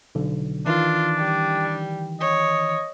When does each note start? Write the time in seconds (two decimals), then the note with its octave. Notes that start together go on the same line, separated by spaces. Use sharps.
0.15 B1 D3
0.66 D#3 E3 D4 F4
1.18 G3
2.21 C#5 D#5